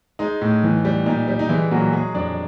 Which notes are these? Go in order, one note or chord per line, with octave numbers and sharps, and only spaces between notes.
G#3 D#4
A2
E3
G3
A#2 D#4
G3
D#4
E3 G#3 E4
A#2 F#3 F#4
F#3 G#3 G#4
F2 D4 D5